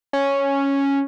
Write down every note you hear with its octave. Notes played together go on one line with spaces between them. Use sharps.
C#4